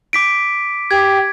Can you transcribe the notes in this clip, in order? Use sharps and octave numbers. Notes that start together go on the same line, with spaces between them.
D6 B6 D7
G4 G#6